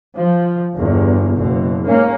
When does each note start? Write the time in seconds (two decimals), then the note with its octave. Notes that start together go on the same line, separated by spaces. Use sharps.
0.16 F3
0.75 G1 E2
1.36 F#1 B2
1.85 G#2 A#3 C#4